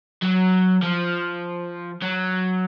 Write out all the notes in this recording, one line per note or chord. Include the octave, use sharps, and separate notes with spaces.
F#3
F3
F#3